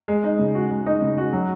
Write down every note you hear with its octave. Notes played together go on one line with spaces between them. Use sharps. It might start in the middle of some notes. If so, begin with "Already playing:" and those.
G#3
D#4
C#3
F#4
G#3
D#4
C#3
F#4
F#3